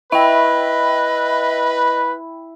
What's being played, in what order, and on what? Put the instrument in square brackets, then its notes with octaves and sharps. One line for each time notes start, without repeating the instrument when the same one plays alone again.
[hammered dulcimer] E4 [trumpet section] B4 [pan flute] D#5 [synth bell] E5 G5